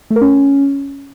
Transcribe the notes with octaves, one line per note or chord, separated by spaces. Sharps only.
A3
A#4
C#4